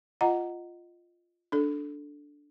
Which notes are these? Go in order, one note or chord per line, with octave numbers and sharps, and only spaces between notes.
F4 D#5 F#5 A#5
D4 A4